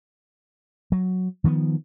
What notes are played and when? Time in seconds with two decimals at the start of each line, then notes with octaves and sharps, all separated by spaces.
0.92 F#3
1.44 D#3 F3 A#3 B3